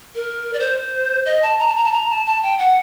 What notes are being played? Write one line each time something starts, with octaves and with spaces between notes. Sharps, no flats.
A#4
D5
C5
D#5
A5
A#5
A5
A#5
A5
A#5
A5
A5
G5
F#5